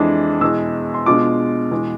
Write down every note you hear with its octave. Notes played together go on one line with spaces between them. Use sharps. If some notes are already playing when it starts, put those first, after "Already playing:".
Already playing: F2 E3 G#3 D4
E2 B2 G#3 E6
C6
B2 G#3 D4 F4 D6
E2 B2 G#3